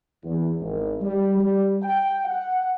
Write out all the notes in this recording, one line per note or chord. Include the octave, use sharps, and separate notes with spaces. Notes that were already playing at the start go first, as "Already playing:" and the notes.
E2
G#1
G3
G3
G5
F#5